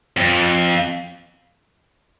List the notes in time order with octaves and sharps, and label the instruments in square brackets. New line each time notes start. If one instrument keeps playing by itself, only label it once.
[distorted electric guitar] F2